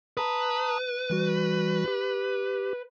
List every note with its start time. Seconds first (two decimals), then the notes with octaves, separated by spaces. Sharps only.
0.17 B4 A5 A#5 D#6
1.10 E3 G3 F#4
1.88 G4